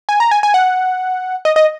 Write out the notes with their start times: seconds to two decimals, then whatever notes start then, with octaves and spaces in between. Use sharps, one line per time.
0.09 G#5
0.20 A#5
0.31 G#5
0.43 G#5
0.54 F#5
1.45 D#5
1.56 D#5